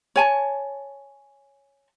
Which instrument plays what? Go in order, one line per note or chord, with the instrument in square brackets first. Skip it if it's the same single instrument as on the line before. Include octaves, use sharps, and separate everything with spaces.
[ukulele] C#5 G#5 A5